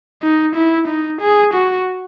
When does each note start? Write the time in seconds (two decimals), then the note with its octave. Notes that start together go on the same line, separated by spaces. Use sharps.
0.22 D#4
0.55 E4
0.88 D#4
1.21 G#4
1.53 F#4